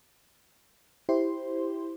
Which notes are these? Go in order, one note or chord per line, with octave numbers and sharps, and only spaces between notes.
E4 G4 C5 C6